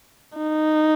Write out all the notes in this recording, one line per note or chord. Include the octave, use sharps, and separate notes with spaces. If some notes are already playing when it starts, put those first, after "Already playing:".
D#4